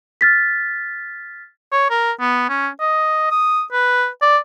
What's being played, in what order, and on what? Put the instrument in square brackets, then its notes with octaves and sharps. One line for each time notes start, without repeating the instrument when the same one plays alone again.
[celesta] F6 A6 B6
[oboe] C#5
A#4
B3
C#4
D#5
D#6
B4
D5